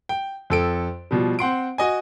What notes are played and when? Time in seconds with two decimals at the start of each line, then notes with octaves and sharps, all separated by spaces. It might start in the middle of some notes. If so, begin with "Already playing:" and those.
0.09 G5
0.50 F2 A4 D7
1.11 B2 F3 G3
1.39 C4 F#5 C6 D7
1.78 F#4 D#5 G#5